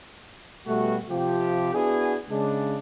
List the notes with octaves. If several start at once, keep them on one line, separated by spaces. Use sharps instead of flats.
B2 G3 A3 F#4
C3 F3 F4 G4
B3 D4 E4 F#4 G#4
C#3 G#3 D4